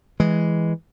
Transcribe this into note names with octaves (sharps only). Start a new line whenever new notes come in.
E3 G#3